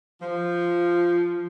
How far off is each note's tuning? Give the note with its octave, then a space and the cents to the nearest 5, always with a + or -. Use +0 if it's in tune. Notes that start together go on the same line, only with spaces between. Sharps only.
F3 -5